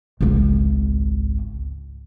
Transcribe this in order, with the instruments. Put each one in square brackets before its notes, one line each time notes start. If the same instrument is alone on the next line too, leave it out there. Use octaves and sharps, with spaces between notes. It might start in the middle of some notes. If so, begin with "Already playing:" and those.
[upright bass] G#1 C#2